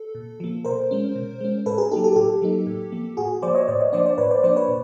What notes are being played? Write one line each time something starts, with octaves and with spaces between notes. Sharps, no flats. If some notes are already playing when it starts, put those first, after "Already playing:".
Already playing: A4
A#2
F3 A#3
B2 A#4 C5
G#3 C#4
B2
G#3 C#4
A2 A4 B4
G#4 A#4
F#3 A#3 D#4 G4 A4
G4 A4
A2 G4 A4
F#3 A#3 D#4
A2
F3 A#3
A2 F#4 G#4
F3 A#3 C5 D5
C#5 D#5
A2 C5 D5
C#5 D#5
F3 A#3 D4 C5 D5
C5 D5
A2 B4 C#5
C5 D5
F3 A#3 D4 C5 D5
B4 C#5
A#2